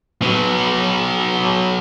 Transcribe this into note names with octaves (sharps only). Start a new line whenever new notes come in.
B2 F#3